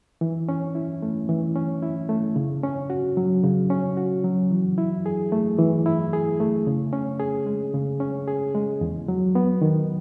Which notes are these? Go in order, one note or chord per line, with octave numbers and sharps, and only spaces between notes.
E3
C#4
E4
A3
E3
C#4
E4
A3
C#3
C#4
F#4
F#3
C#3
C#4
F#4
F#3
E3
E4
G#4
A3
E3
E4
G#4
A3
C#3
C#4
G#4
G#3
C#3
C#4
G#4
G#3
E2
F#3
B3
D#3